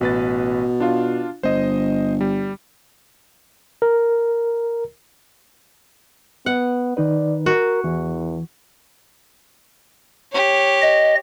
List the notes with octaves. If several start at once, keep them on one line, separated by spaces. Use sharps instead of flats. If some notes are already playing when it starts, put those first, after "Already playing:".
A1 B2 B4 A6
D4 F4 F5
G1 C5 D#5
G3
A#4
B3 F#5
D#3 D#4 B4 D5
F#4 A#4
E2 E3
G4 C#5
D#5